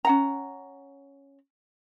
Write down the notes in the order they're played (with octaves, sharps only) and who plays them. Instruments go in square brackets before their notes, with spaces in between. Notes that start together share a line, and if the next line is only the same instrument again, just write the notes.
[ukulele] C#4 F#5 A#5